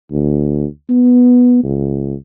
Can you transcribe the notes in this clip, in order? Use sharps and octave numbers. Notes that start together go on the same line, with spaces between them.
D2
B3
C#2